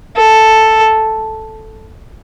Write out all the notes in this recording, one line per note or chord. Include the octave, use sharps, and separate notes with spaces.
A4